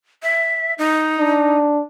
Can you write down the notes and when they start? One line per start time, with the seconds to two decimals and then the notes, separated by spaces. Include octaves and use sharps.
0.23 E5
0.78 D#4
1.19 D4